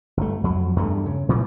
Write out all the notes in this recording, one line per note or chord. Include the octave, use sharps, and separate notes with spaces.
G1 A3
F2 F#3
E2 G2 A3
C#3
A#2 E3 F3 A3